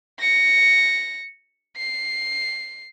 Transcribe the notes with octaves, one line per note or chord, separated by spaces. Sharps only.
A#6 C#7
C7